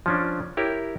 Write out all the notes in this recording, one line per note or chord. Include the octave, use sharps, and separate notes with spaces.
F3 C#4 D4
E4 G4 A#4 C#5